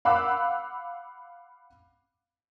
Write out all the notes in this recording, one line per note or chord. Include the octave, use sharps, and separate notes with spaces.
F5 F#5 B5 D6 E6 F#6